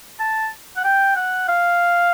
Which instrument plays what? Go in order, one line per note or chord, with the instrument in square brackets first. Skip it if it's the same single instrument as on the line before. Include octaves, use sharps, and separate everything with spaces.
[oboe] A5
F#5
G5
F#5
F5